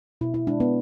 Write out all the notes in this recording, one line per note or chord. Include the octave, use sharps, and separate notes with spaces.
B2 E4
E4
G#3 D4
B3